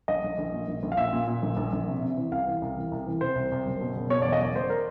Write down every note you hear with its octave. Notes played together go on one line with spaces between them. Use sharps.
A#1 D#5
A#1
A#1
A#2
A#1
A#1
F5
A#2 E5
A#2
A#2
A#1
A#1
A#1
C3
C3
E3
C2 F5
E3
C2
E3
C2
E3
C3 C5
C2
C2
F#1
B2
F#1
B2 C#5
D5
E2
D#5
F#1 D5
F#1 C5
A#4